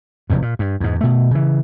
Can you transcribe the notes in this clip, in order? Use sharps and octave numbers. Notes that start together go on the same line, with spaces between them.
F1 E2 G2
A#2
G2
E2 G#2
B2 A3
C#3 E3